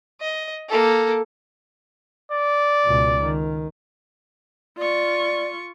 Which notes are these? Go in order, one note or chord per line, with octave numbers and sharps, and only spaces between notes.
D#5
A#3 A4
D5
C#2 B2
D#3
F4 D5 C#6